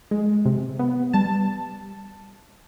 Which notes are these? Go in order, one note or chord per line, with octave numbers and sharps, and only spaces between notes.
G#3
C3
B3
G3 A5